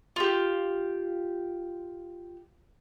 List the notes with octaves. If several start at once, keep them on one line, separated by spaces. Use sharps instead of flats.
F4 G4